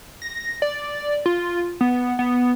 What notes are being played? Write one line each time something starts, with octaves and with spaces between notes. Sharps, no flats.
A#6
D5
F4
B3
B3